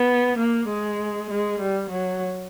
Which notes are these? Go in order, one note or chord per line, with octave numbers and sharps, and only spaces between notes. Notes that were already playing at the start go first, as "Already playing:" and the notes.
Already playing: B3
A#3
G#3
G#3
G3
F#3